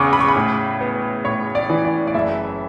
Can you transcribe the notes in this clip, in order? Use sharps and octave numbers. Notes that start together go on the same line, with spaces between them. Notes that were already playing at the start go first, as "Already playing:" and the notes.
Already playing: E2 C#3 C#6 D6
B5
C#6
B5
A2
B3
A2 C#5
D5
E3
D5
D5
F#1 E5